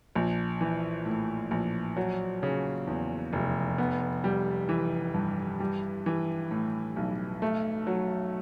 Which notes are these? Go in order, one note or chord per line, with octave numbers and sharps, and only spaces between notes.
A#1
E3
A2
A#1
F#3
C#3
E2
F1
B3
G3
E3
G2
G3
E3
A2
B1
A3
F#3